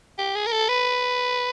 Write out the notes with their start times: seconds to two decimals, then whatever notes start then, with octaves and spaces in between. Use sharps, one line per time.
0.18 G4
0.35 G#4
0.46 A#4
0.52 A4
0.69 B4